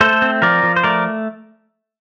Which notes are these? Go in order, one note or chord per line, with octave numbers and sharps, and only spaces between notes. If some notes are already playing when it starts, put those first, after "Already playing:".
A3 A4 C5
C4
F3 A#4 D5
F3
C5
A3 A#4 D5